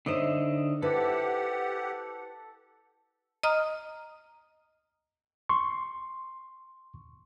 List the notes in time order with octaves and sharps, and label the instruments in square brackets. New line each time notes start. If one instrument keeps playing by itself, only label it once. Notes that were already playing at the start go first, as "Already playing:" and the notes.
[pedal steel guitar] D3 D#5 E5 [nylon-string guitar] D#4 C5 C#5
[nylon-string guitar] E4 B4 C5 [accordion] G4 F#5 [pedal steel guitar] A4
[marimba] D#5 A#5 D#6 F6
[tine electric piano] C6 C#6